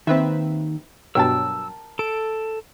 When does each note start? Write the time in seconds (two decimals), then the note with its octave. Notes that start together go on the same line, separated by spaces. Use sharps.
0.07 D#2 D#3 C4 B4 E5
1.15 G2 B2 F#3 A#4 G5 A5 E6
1.99 A4 D7